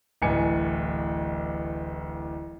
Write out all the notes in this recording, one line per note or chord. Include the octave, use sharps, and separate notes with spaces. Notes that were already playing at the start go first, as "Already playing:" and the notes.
D1 A1 G#5 C#7